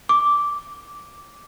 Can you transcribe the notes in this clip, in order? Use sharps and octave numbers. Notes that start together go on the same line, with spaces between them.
D6